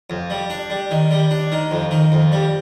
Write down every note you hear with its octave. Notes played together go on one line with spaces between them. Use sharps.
F2
G3
D4
G3
D#3
G3
D4
D#3
F2
D#3
F2
G3